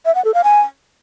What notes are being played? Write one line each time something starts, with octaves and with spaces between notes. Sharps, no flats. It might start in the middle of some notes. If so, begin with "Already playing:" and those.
E5
F#5
A4
F5
G#5